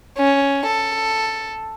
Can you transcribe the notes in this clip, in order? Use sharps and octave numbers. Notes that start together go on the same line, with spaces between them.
C#4
A4